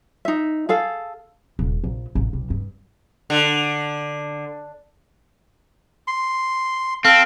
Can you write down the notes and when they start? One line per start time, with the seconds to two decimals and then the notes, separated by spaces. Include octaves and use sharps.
0.25 D#4 E5
0.69 G#4 A4 F5
1.59 D#1
1.84 A#1
2.15 A1
2.33 B1
2.50 G2
3.30 D3
6.08 C6
7.05 C4 A4 F5